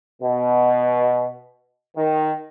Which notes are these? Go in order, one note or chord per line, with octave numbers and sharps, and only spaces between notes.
B2
D#3